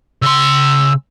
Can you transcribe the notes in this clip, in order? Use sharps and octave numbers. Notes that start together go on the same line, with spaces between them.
C#3 C6 E6